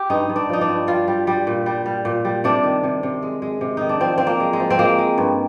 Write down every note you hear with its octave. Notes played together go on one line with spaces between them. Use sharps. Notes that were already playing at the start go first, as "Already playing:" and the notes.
Already playing: G4
G2 D#4
G2
D4
F3 D#4
D4
G2
G3 F4
G3
G3
A#2
G3
G3
A#2
G3
C3 D4
D#3
C3
C3
G#3
G#3
C3
D#3 D#4
D4
F3 C4
F3 C4
A#3
G#3
G#3
F3
C4
G#3 A#3
G#3
G2